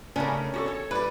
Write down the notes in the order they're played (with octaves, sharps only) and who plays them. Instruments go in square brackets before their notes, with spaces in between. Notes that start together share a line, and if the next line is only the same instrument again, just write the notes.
[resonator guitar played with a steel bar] C#3 A3 A#4 [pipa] G3 D4 [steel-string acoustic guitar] C#4
[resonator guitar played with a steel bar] F#4 G4 A4
A4 C#5
[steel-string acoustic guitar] G3 D5 [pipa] B4